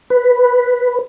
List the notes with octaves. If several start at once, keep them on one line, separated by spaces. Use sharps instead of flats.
B4